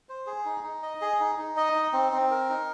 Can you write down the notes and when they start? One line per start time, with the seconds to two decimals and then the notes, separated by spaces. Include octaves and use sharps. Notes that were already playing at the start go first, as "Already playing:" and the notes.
0.09 C5
0.26 G#4
0.45 D#4
0.64 D#4
0.83 D#5
1.01 G#4
1.20 D#4
1.39 D#4
1.57 D#5
1.75 D#4
1.93 C4
2.12 C4
2.31 A#4
2.50 D#4